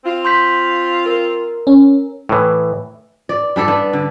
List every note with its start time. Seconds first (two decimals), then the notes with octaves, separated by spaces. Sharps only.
0.05 C4 F4
0.25 C6 G6 B6
1.06 A#4
1.67 C#4
2.29 A2 E3
3.29 D5
3.56 G3 D4 A4 D5
3.68 B3 D4
3.93 D3